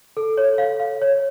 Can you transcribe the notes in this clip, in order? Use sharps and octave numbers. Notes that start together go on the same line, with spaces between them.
A4
C#5
F5
F5
C#5